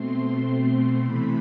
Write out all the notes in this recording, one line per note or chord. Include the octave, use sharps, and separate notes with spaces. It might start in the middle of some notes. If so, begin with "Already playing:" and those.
Already playing: B2 A3 C4 C6
C6
C3 E3 A3 B5